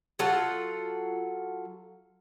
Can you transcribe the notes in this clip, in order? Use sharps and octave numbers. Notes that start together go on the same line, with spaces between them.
F#3 F4 A4 F#5